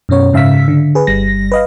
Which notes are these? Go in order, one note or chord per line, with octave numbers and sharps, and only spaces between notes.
F#2 B2 C#4 C#5
G#2 C#3 E5 F5 E6 B6
D3
G#4 B4
G1 G3 A#6
B4 D#5 F5